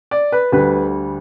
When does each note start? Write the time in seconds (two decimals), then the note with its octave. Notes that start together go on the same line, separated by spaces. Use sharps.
0.11 D5
0.32 B4
0.52 D2 D3 G3 B4